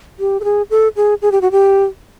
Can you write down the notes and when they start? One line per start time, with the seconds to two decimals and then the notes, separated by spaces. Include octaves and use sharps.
0.19 G4
0.40 A4
0.44 G#4
0.70 A4
0.96 G#4
1.22 G#4
1.32 G4
1.41 F#4
1.51 G4